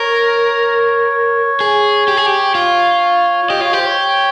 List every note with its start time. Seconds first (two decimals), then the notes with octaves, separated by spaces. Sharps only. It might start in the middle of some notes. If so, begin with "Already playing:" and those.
Already playing: A#4 C#5
1.60 G#4
2.08 G4
2.17 G#4
2.26 G4
2.55 F4
3.49 G4 D#5
3.61 F4 C#5
3.73 G4 C5
3.86 C#5